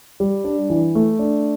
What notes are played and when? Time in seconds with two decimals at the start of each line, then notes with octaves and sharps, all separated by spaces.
0.20 G3
0.44 D4
0.70 E3
0.95 A3
1.19 D4